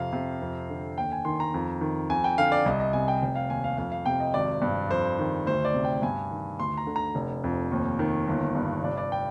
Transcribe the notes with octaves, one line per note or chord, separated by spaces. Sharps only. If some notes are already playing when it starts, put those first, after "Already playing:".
Already playing: F2 C3 F5
C3
F2
D3
D#2 G5
G#5
D#3 C6
A#5
F2
D#3
F2 G#5
G5
D3 F5
D5
C2 D#5
D#5
C3 G#5
G5
F1 G5
F5
D#2 G#5
F5
F2 F5
F5
C3 G5
D#5
G#1 D5
G2
F2 C5
D#3
D2 C5
D5
C3
G5
G2 G#5
D#3
D2 C6
A#5
D3
A#5
F1
F2
D#2
D#3
G1
G2
F1 D5
D5
G5